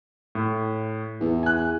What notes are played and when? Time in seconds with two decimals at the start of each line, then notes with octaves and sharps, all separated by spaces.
0.35 A2
1.21 E2
1.43 G#5 F#6